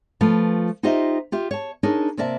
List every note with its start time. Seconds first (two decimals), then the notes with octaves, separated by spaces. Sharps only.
0.21 F3 A3 F4 B4
0.83 D#4 F4 G4 C5 D#5 E5
1.32 F4 G4 E5
1.51 C#5 A5
1.83 D4 D#4 G#4 A#4 C#5
2.17 C3 A#3 D5 E5 A5